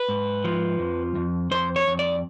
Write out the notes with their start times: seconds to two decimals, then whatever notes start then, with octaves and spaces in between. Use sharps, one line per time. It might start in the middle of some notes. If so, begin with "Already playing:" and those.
Already playing: B4
0.09 G#2
0.44 F3
0.79 F2
1.15 F2
1.51 F2 C5
1.76 C#5
1.87 F2
1.99 D5